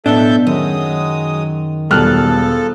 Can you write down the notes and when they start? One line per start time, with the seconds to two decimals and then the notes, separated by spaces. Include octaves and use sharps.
0.06 B1 A2 B3 D4 A4 E5 G6
0.47 F#2 D#3 F#3 G#3 D#6
1.91 E1 F3 G3 A4 F6 F#6